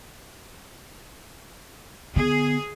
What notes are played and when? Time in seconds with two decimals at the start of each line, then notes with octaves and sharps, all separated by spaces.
2.16 D3 B3 G#4